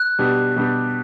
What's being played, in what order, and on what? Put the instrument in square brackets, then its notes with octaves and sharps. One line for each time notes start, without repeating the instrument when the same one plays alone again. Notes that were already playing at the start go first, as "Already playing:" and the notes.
Already playing: [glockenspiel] F#6
[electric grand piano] B2 G3 D4 G4
B2 G3 D4 G4